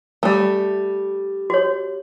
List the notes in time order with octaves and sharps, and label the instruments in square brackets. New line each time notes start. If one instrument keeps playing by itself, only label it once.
[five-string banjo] G3 A3
[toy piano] F#4 C#5